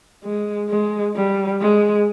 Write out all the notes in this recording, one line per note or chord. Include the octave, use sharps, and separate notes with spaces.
G#3
G#3
G3
G#3